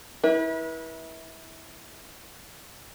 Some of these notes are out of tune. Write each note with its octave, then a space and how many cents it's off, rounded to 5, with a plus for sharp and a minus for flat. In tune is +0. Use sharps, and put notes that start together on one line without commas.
E4 -25 B4 -35